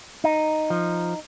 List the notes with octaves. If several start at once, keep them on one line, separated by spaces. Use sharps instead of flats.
D#4
F3